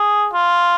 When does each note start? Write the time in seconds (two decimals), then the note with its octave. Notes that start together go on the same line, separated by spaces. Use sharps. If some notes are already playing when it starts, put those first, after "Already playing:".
Already playing: G#4
0.33 F4